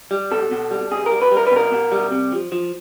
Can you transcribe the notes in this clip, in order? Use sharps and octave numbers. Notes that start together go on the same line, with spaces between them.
G3
B2 A4
B2
G3
B2 G#4
G3 A#4
B4
G3
A#4
B4
B2 A#4
B2
G3
C3
F3
F3